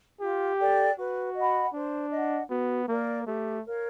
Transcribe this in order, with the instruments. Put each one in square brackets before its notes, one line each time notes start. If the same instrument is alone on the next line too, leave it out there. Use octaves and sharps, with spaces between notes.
[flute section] F4 [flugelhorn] G4
[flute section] A4 D5 G5
[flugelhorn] F#4 [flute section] B4
[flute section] D#5 F#5 B5
[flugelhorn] D4 [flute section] C5
[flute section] D#5 F#5
[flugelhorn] B3 [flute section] F#4
[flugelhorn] A#3 [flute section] A#4 D5 F5
[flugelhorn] A3 [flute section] G4
[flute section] A#4 C#5 F5